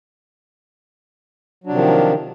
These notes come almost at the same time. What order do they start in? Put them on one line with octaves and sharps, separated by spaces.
F#3 D4 C3 F3 D#3